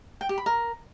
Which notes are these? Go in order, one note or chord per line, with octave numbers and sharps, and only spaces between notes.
G5
G4
B5
A#4